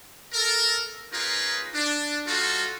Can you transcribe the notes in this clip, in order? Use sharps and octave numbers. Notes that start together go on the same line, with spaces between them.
A4 A#4
C#4 D#4 F4 G#4 A#4 B4
D4
G3 D#4 F4 F#4 A4